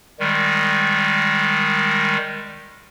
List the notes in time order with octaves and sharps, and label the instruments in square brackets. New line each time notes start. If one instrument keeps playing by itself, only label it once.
[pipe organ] D#3 G3 G#3